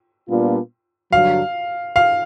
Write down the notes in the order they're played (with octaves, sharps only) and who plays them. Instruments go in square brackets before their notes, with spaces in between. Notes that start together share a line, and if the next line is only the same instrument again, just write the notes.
[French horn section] A#2 G3 B3 D4 F4
[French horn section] G2 D3 F#3 [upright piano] F5
[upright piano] F5